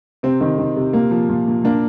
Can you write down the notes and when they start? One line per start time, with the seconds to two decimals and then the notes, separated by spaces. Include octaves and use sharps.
0.23 C3 C4
0.41 D#3
0.58 D#3
0.76 C3
0.93 A#2 A#3
1.11 F3
1.29 A#2
1.48 A#2
1.64 A#2 A#3 D4